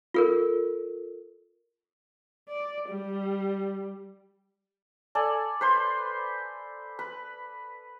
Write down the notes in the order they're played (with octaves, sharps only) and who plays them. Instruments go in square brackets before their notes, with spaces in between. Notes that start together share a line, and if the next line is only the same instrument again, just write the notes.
[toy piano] F4 A4 A#4
[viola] D5
G3
[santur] A4 D5 G#5
B4 C5 C6
B4